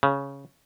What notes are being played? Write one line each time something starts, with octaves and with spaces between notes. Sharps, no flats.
C#3